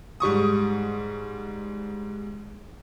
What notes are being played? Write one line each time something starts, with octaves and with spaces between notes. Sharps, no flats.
G#2 G3 C#6 D#6